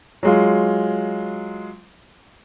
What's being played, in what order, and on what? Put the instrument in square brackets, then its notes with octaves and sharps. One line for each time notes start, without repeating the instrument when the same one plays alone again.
[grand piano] F#3 G#3 F4